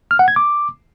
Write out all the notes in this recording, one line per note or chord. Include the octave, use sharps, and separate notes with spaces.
F6
F#5
G#6
D6